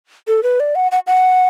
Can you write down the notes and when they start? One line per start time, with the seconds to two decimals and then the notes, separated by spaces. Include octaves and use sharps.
0.28 A4
0.43 B4
0.60 D5
0.75 F#5
0.92 F#5
1.07 F#5